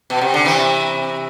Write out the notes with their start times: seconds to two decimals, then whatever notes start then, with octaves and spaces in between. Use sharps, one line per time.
0.10 B2
0.21 C3
0.34 D3
0.45 C3 E3